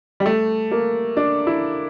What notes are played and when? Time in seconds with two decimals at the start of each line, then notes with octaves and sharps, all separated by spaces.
0.20 G3
0.26 A3
0.72 A#3
1.17 D4
1.47 E4